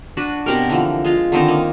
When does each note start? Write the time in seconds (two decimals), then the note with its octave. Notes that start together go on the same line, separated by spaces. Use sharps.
0.17 D4 F#4 B4
0.46 B2 C4 G4 A#4
0.69 D3 E3 F3
1.05 G#3 F4
1.32 D3 D#3 C4 D#4
1.48 A#3 D#4